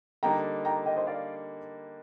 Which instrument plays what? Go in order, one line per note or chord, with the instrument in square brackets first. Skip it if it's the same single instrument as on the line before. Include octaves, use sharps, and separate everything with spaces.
[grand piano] D3 G3 A#3 D#4 [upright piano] G5 A#5
[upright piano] G5 A#5
D#5 G5
C5 D#5
D5 F5